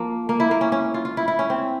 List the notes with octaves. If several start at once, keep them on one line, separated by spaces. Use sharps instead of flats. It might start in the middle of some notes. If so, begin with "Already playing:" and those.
Already playing: F3 A#3
A#3
E4
A#3
C#4
C#4
F4
F4
E4
E4
C#4
C4